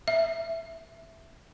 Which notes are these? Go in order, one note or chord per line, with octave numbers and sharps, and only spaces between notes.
E5